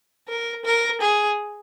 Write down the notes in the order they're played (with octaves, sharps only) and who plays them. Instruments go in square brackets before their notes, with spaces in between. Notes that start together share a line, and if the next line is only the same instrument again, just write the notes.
[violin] A#4
A#4
G#4